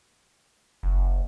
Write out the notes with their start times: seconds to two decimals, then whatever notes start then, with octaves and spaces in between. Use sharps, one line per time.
0.83 F#1